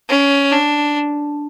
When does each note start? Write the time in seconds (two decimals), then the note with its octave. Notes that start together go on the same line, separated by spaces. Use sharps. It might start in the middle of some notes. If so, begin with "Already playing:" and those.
0.09 C#4
0.52 D4